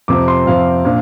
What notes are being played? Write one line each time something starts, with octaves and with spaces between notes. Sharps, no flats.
F2 C3 F3 C4 D6
C6
F2 C3 F3 C4 F5
A#2 F3 D4